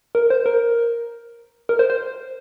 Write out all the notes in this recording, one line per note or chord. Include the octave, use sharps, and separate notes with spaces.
A#4
C5
A#4
A#4
C5
C5